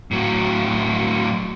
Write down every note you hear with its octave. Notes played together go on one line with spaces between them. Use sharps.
A2 F#3